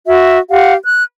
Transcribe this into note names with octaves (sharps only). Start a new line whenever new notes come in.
F#4 E5
G4 F5 F#5
F#6